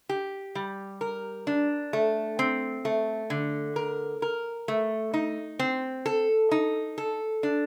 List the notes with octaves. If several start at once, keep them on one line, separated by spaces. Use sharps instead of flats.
G4
G3
A#4
D4
A3
C4
A3
D3
A#4
A#4
A3
D#4
C4
A4
D#4
A4
D4